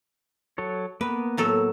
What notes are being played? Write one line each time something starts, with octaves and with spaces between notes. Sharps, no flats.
F#3 A4 C#5
A#3 B3 B4
A2 F#3 A4